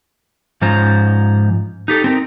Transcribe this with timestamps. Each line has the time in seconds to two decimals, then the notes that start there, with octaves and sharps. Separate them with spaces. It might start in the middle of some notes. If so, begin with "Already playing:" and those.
0.61 G#2 F3 C#4 F4 C5 A#5
1.88 D#4 G4 A4
2.04 C4 D#4 A#4